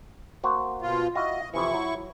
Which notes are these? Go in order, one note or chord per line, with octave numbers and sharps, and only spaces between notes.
A#3 F#4 C5
B2 F4
E4 F#4 D#5 F5
F2 C3 E3 E4 C#6
F#3